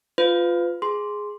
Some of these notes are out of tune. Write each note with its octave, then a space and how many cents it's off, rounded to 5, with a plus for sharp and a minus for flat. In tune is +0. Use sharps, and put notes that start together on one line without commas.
F4 +0 B4 +30
G#4 +0 C6 +0